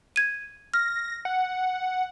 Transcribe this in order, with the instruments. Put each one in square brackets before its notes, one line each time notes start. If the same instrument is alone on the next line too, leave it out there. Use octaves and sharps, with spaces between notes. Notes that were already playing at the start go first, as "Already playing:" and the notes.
[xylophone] G#6 D#7
[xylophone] F6 [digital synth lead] A#6
[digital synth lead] F#5